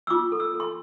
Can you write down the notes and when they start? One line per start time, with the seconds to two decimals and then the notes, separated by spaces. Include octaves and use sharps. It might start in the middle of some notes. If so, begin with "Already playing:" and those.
0.07 E6
0.10 F4 D6
0.32 A4
0.40 E6
0.54 A4
0.60 C6